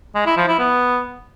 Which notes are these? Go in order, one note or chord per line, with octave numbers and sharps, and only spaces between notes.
G#3
E4
F3
E4
B3